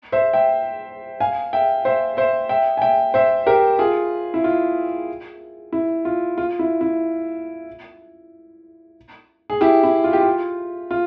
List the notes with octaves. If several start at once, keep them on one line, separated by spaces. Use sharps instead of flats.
C5 E5
E5 G5
F5 G#5
E5 G5
C5 E5
C5 E5
E5 G5
G#5
E5 G5
C5 E5
G4 A#4
F4 G#4
E4
F4
E4
F4
F4
E4
E4
G#4
E4 G4
E4
F4
G4
F4
F4